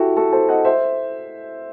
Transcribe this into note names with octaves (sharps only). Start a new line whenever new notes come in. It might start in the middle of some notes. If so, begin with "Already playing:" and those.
Already playing: E4 F#4 G4 A4
F#4 A4
A4 C5
D#5 F#5
C5 E5